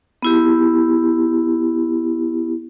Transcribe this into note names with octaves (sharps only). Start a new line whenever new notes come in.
B3 E4 G4